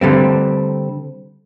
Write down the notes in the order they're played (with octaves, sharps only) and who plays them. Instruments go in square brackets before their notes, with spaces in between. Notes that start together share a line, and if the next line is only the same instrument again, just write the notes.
[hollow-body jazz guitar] D3 G3 A3 C4